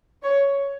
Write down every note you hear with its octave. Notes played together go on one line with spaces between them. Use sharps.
C#5